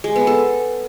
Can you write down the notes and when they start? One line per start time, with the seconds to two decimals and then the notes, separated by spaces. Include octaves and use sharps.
0.04 G#3
0.16 B3
0.27 A4